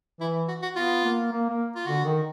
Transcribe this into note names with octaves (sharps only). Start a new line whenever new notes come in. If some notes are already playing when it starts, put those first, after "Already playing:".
E3 E4
F#4
F#4
B3 F4
A#3
A#3
A#3
F4
D3 F#4
D#3